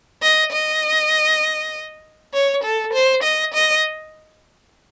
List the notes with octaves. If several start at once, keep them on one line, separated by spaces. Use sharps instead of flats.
D#5
D#5
C#5
A4
C5
D#5
D#5